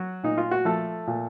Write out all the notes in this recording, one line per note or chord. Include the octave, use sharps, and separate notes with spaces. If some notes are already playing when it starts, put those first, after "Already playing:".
Already playing: F#3 F#4
A#2 D#4
F4
F#4
F3 A3 A4
A#2